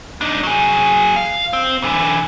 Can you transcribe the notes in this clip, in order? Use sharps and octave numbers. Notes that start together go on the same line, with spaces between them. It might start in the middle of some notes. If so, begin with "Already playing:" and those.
D4 D#4
F#3 G#4
F5
C4
D3 E3